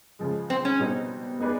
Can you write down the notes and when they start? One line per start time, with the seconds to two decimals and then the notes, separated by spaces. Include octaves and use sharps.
0.19 C#3 F3 G#3
0.50 C4
0.65 C#4
0.79 B2 G3 C4 D#4 G4
1.40 B3 D#4 G#4 B4 D5